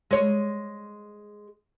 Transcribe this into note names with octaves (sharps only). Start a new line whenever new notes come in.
G#3 C#5